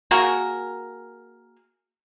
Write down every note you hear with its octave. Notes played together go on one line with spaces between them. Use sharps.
A#3 F#4 G#4 A#4